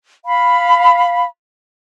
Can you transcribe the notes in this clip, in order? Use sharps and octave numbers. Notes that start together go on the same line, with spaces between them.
F5 B5